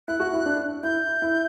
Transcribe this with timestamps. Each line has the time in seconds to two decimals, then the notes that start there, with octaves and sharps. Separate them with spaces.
0.08 E4 F#6
0.20 F#4
0.33 E4
0.46 D4
0.83 E4 G6
1.22 E4